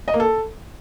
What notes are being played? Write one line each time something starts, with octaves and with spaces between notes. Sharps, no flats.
D#5
A#3
A4